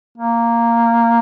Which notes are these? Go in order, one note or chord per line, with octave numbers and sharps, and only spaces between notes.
A#3